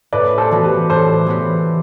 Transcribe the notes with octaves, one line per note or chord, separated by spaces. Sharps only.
A2 B4 D5
A4 C5
E3 B3 F#4
G4 B4
A2 A4 C5
E3 B3 F#4